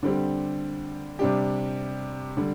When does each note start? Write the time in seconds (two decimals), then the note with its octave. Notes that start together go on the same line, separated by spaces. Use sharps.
0.03 D3 G3 C4 G4
1.19 C3 G3 D4 G4
2.37 D3 G3